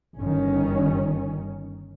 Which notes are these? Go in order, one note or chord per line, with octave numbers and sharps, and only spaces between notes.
G1 D#3 C#4